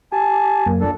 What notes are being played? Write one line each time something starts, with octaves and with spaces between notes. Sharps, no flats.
G4 G#5 A5
F#2 A#3
A#2 D4 A4